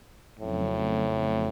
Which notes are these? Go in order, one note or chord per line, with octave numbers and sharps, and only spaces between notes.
F2 A2 C#3 F#3 A3 C4